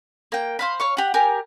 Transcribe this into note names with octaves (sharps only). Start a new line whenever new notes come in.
A#3 G5
C5 F5 B5
C#5 F5 C#6
G4 F#5
G4 A#4 G#5